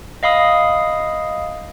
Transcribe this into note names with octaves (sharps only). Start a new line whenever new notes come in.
D#5 F5 B5 D#6